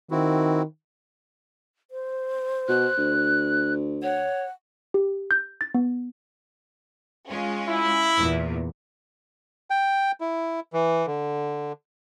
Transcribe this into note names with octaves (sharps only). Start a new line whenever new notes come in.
D#3 C4 E4 F#4
C5
B2 F#6
D2
C#5 F#5
G4
G6
A6
B3
G#3 C#4 F4
E4
E2 A#2
G5
E4
E3
D3